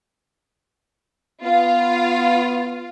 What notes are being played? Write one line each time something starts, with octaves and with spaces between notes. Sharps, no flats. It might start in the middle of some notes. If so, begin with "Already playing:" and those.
B3 F4 F5